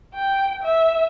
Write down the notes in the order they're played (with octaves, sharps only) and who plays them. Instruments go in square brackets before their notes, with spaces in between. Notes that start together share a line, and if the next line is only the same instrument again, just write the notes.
[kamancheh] G5
E5